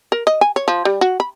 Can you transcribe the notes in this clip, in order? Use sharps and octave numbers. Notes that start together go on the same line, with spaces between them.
A#4
D#5
G#5
C#5
F3
G3
F#4
B5